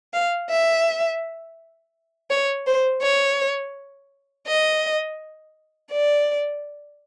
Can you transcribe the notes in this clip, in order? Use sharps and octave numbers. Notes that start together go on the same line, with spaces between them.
F5
E5
C#5
C5
C#5
D#5
D5